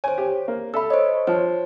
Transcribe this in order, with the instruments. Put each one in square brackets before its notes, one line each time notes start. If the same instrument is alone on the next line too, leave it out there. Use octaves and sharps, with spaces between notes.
[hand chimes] C5 C#5 [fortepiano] G#5
[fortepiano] G4
A#3
[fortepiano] A4 E5 [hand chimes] B5 E6
[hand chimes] C5 D#5 [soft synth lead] C#5
[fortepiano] F3 [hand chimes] C5